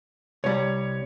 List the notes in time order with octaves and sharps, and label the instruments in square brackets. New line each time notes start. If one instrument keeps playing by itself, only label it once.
[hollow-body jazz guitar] C2 G3 [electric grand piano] C#5